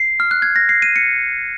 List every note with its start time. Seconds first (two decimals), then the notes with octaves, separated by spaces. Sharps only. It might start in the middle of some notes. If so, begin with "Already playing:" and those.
Already playing: C7
0.20 F6
0.31 F#6
0.42 G#6
0.56 A#6
0.69 C7
0.82 D#7
0.96 C#7